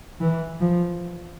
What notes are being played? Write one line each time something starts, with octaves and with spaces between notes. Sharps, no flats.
E3
F3